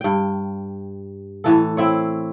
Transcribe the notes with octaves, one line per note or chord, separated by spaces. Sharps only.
G2 G5
A2 E3 A4
C4 E4 C#5